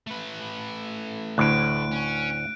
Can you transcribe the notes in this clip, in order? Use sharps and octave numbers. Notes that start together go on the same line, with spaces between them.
A3 B4
D2 A2 F#6 D7
C#4